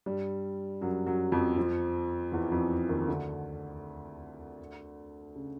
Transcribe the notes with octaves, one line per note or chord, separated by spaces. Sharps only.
G2 G3
F#2 F#3
F#2 F#3
F2 F3
F2 F3
E2 E3
F2 F3
D#2 D#3
D2 D3
C#3